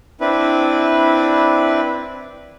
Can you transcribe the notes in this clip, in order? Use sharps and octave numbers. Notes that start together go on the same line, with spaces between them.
C4 D4 E4 B4